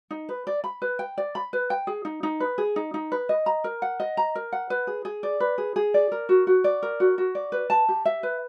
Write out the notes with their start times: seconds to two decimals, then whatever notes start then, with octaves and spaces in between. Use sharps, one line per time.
0.11 D#4
0.29 B4
0.47 D5
0.64 B5
0.82 B4
0.99 G5
1.18 D5
1.35 B5
1.53 B4
1.70 G5
1.87 G#4
2.05 D#4
2.23 D#4
2.40 B4
2.58 G#4
2.76 D#4
2.94 D#4
3.12 B4
3.29 D#5
3.46 A#5
3.64 A#4
3.82 F#5
4.00 D#5
4.17 A#5
4.35 A#4
4.52 F#5
4.70 B4
4.87 G#4
5.05 G#4
5.23 D5
5.40 B4
5.58 G#4
5.76 G#4
5.94 D5
6.12 A#4
6.29 F#4
6.47 F#4
6.64 D5
6.83 A#4
7.00 F#4
7.18 F#4
7.35 D5
7.52 B4
7.70 A5
7.89 G4
8.05 E5
8.23 B4